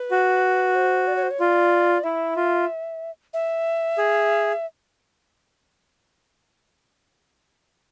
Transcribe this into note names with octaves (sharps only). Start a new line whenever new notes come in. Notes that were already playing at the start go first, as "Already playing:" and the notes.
Already playing: B4
F#4
C5
D5
C#5
C5
C#5
F4 D5
E4 E5
F4
E5
G#4